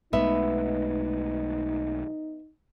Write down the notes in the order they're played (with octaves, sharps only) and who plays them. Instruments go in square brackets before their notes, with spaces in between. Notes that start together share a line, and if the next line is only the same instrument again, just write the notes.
[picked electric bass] B1 G#3 A3 [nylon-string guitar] B3 E5 [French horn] D#4